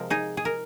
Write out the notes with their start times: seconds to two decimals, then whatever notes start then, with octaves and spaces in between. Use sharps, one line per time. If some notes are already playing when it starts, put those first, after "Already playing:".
Already playing: C3 F3 G#3 F4 A#4
0.10 D#4 G#4
0.37 G#4
0.45 A#4